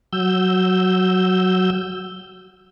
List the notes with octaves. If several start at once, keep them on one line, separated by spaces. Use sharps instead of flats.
F#3 E6 G6